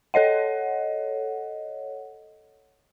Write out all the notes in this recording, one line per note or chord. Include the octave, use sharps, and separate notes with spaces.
A4 C#5 D#5 F#5